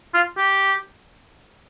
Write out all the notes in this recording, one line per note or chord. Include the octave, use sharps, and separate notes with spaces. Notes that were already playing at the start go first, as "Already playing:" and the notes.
F4
G4